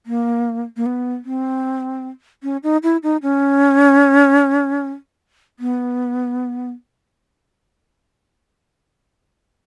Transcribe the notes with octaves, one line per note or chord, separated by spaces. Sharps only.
A#3
A#3
B3
C4
C#4
D#4
E4
D#4
C#4
B3